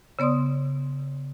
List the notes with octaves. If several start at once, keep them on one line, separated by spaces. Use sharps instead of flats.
C#3 B3 D5 C6 D#6